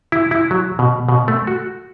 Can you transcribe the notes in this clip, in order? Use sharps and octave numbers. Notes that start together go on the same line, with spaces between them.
E4
E4
F#3
B2
B2
A3
F#4